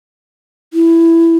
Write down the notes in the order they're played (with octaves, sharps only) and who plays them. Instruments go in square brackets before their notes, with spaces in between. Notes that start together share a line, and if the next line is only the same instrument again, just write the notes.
[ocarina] E4